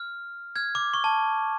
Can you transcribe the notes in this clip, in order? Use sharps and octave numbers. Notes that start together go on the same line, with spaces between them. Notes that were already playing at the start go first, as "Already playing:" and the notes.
Already playing: F6
F6 G#6
D6
C#6
A5